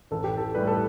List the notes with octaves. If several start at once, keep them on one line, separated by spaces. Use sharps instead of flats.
A1 A4
G4
A4
A2 G3 B4
A4